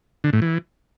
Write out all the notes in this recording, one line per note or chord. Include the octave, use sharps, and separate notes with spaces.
D3
A2
E3